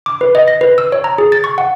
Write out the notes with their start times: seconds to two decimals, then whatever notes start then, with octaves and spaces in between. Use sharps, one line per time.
0.06 D6
0.21 B4
0.35 D#5
0.48 A#6
0.61 B4
0.78 E6
0.92 C#5
1.04 A#5
1.18 G#4
1.32 A6
1.44 C#6
1.58 F#5